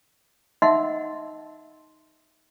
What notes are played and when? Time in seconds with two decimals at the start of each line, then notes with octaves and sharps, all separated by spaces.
0.62 D#4 D#5 E5 F#5 C6 E6